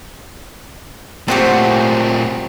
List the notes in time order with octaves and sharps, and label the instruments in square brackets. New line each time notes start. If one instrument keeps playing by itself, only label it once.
[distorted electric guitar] A#2 A3 [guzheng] C4 F#4 G4